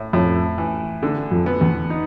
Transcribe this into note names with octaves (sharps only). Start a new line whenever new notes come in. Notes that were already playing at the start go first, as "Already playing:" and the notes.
Already playing: A2
F2 A2
E3
D3
F2
B3
E2
D#4